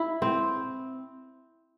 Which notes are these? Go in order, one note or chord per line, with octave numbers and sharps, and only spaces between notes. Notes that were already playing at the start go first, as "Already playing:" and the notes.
Already playing: E4
C4